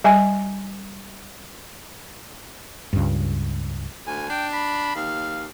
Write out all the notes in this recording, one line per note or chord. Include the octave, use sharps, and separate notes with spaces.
G3 E5 G#5
C#2 G2
D2 G#5
D4 G5
B5
D#2 F5